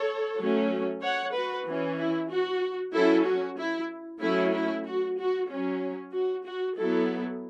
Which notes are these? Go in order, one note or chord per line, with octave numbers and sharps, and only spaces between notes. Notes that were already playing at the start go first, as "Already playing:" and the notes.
Already playing: A4 C#5
F#3 A3 C#4
C#5 F#5
F#4 B4
E3 C#4
E4
F#4
F#3 C#4 E4 A4
F#4
E4
F#3 A3 C#4 E4
E4
F#4
F#4
F#3 C#4
F#4
F#4
F#3 B3 E4 A4